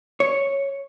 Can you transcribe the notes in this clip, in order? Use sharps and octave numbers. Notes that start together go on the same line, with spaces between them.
C#5